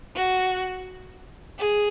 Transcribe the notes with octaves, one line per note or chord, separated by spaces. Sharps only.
F#4
G#4